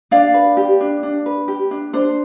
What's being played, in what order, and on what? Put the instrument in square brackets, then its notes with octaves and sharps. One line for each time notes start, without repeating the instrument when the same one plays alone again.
[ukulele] D4 D5 F5
B4
G4
D4
D4
B4
G4
D4
D4 C5